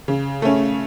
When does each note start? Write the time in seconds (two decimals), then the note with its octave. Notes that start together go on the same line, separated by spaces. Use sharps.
0.08 C#3
0.42 A3 C#4